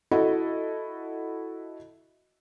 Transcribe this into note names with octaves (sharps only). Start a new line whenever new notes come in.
E4 F#4 A4 D#5 F#5